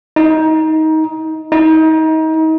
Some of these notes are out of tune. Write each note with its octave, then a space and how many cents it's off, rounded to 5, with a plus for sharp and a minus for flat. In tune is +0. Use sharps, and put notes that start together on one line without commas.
D#4 +20
D#4 +30